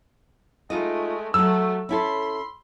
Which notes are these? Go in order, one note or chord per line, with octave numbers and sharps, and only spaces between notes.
G#3 A3 D#4 F4 D#5
F#3 A3 F#4 A4 E6
C#4 E4 A4 B5 C6